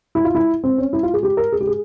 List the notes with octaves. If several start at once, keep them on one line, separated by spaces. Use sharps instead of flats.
E4
F4
E4
C4
C#4
E4
F4
G#4
G4
A#4
G#4
G4
G#4